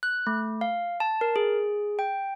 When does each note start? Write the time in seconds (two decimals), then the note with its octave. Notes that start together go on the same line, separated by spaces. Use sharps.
0.03 F#6
0.27 A3
0.61 F5
1.00 A5
1.21 A#4
1.36 G#4
1.99 G5